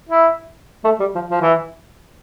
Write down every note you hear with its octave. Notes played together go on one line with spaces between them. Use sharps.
E4
A3
G3
F3
F3
E3